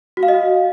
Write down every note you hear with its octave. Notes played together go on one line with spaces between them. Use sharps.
F#4
F5
D#5
F#4